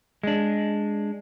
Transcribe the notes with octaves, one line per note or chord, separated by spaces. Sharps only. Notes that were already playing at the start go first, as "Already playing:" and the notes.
G#3 D4